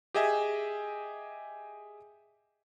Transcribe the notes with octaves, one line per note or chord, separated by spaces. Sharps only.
G4 G#4 D#5 E5 G#5